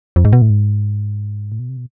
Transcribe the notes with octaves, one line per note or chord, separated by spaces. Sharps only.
F2
G#2
B2
A2
G#2
A2
B2
C3
B2